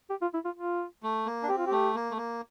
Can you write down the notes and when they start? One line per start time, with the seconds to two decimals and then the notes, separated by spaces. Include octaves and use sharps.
0.10 G4
0.22 F4
0.34 E4
0.45 F4
0.56 F4
1.03 A3
1.26 A#3
1.43 D4
1.49 C4 G4
1.58 F4
1.67 A3 G4
1.95 A#3
2.11 A3
2.17 A#3